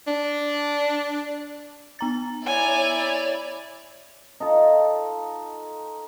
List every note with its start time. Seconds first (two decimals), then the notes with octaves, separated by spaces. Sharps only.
0.08 D4
1.99 B3 A#5 A6
2.46 E4 C#5 D5 G#5
2.99 C#5
4.40 D#4 F4 A4